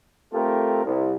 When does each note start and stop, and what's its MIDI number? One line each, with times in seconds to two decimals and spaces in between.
0.33 0.82 57
0.33 0.82 60
0.33 0.82 65
0.33 0.82 67
0.33 0.82 69
0.33 0.82 70
0.85 1.15 36